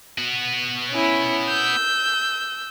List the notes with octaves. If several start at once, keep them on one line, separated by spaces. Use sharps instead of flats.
B3 F#4
C#4 E4
E6 G6